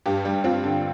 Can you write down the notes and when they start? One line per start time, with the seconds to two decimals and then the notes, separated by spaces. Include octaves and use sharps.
0.06 G2 G4
0.25 G3
0.44 C4 F4
0.64 D3